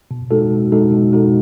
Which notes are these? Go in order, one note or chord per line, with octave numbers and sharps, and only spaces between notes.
B2
G#3 D#4 F#4 A4
B2
G#3 D#4 F#4 A4
B2
G#3 D#4 F#4 A4